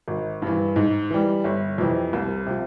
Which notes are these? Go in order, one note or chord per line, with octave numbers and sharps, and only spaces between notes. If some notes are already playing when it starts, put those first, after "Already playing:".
G#1
G2 E3
G#2
E3 G3
G1
F2 C3 E3
C2
C3 F3